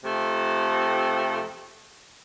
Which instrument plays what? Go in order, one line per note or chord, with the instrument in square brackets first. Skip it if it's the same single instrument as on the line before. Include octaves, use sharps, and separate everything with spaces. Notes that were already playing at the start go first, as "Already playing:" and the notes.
[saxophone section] F2 C3 A3